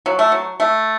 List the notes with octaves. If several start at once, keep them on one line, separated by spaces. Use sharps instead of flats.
F#3
A3
F#3
A3